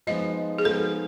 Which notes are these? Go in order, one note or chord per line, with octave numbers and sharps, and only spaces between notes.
F3 G#3 B3 D#4 D#5
G#4
F3 G#3 B3 D#4 A4